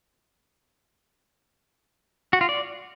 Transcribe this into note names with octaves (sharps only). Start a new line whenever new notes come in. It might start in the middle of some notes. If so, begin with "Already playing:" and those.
F#4
F4
D5